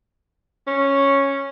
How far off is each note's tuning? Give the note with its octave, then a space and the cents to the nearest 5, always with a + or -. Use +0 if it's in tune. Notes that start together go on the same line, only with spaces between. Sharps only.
C#4 -5